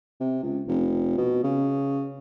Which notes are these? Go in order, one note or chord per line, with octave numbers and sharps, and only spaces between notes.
C3
C#2
F1
B2
C#3